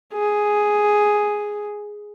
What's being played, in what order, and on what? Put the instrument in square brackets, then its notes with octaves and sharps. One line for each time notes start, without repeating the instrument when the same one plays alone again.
[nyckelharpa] G#4